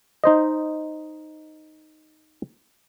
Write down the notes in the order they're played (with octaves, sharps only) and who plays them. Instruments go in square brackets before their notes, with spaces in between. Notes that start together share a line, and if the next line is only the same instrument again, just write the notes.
[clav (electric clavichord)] D#4 C5 D#5